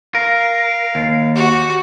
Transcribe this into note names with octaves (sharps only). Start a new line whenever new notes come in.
A#4 F5
D#2
F#4 G4